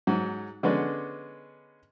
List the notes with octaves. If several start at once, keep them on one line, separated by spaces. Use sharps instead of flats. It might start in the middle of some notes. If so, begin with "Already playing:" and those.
G#2 F#3
D3 G#3 B3 C#4 D5